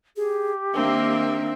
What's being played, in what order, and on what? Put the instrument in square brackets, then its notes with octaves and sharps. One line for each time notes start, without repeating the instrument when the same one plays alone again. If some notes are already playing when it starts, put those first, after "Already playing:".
[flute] G4 [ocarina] G#4
[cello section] D#3 A#3 A#4 [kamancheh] C4 E5 [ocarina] D4